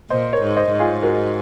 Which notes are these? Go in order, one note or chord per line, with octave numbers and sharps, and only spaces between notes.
A#2 C5 D#5
A#4 C#5
G#2
C5 D#5
G#2
F4 G#4
F#4 A#4